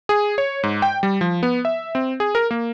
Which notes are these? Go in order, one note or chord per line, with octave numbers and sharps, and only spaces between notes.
G#4
C#5
G#2
G5
G3
F3
B3
E5
C4
G#4
A#4
A#3